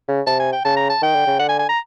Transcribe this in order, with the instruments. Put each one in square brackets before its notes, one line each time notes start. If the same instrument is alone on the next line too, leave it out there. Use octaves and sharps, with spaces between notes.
[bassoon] C#3
[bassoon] C3 [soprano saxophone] A5
[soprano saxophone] G#5
G5
[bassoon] C#3 [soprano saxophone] A5
[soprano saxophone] A#5
A5
[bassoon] D#3 [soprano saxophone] G5
[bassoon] D3
C#3
[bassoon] D3 [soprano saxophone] F#5
[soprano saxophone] G#5
G#5
A#5